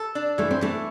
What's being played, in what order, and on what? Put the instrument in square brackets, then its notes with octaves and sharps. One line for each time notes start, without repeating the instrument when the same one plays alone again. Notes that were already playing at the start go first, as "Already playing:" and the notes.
Already playing: [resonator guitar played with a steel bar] A4
D4
[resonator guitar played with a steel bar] E3 [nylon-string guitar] A3
[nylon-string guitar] C4
[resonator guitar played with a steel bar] E3 [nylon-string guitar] A3